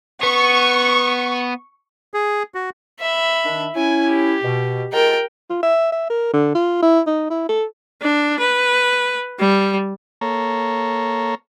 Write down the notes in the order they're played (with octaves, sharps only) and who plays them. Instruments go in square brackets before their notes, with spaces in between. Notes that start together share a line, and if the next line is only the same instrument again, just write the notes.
[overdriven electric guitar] B3 [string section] C#6
[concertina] G#4
F#4
[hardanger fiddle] E5 B5
[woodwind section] D#3 D4
[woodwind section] C#4 E4 [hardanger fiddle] G#5
[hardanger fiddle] G4
[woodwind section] B2
[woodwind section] G#3 F4 A4 [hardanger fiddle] A#4 G5
[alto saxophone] F4
E5
E5
A#4
D3
F4
E4
D#4
E4
A4
[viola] D4
B4
G3
[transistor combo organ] A#3 A4 C#5 A#5